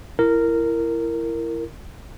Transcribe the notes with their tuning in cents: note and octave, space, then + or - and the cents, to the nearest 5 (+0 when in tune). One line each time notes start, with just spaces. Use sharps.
E4 +20 A#4 -10